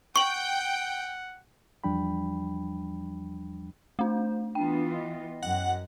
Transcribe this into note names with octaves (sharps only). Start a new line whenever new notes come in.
F#5 G5 C#6 F#7
E2 F3 G3 D4 G5 B5
A3 D4 C5
E3 B3 D4 F4 G5
D#5
F#2 F#5